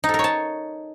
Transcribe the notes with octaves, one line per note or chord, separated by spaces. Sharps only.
D#4
A4
A#4
C#5
A5